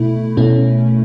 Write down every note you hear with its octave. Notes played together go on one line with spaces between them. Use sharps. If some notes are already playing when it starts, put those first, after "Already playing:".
Already playing: B2 A3 E4
B2 A3 C#4 E4